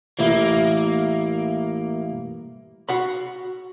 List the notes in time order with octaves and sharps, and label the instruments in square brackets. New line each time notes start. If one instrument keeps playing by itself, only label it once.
[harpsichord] A1 E4 [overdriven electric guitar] A#3
[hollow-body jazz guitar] F#4 F#5 B5